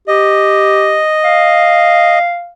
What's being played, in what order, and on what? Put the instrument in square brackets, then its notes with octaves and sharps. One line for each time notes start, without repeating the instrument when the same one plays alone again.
[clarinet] G4 [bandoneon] D#5
[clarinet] F5